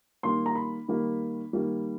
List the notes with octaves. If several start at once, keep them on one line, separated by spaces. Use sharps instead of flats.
D#3 G3 A#3 C6
A#5
B5
D#3 G3 A#3
D#3 G3 A#3